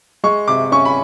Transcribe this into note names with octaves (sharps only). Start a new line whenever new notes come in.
G#3 C#6
C3 D6
C#4 C#6
B5